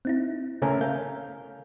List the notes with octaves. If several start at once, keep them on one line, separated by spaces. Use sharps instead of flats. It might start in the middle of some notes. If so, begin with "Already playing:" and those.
C4 D#4 E4
C#3 A3 C#4 A#4
F5 G6